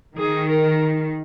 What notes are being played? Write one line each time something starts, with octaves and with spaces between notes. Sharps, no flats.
D#3 G#4
A#4